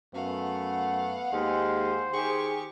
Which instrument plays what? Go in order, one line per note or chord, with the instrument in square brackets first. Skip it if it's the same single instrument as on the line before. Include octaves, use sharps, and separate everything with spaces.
[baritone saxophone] F#2 [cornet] A3 [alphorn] B3 [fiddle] F5 F#5
[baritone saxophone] D#2 [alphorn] G#3 [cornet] C5
[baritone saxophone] D#3 [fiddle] G4 C#6 [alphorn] G#4